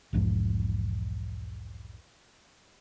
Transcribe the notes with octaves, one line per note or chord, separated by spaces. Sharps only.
B1 E2 G#2 F3